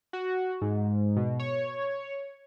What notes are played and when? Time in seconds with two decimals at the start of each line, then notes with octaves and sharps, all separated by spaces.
0.13 F#4
0.62 G#2
1.17 B2
1.39 C#5